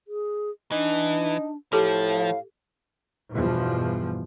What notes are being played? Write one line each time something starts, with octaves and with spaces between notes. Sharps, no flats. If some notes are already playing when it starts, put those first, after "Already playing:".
G#4
E3 D4 D#4
A2 F3 G4 A4
F5
E2 G2 B2 F3